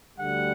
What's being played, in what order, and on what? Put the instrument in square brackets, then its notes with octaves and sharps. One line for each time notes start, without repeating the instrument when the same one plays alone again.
[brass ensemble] D2 D3 G3 F#5